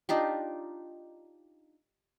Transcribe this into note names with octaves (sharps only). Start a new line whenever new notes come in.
D4 D#4 F4 G4